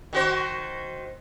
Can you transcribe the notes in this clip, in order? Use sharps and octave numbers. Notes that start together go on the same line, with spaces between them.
D#3 F#4 C5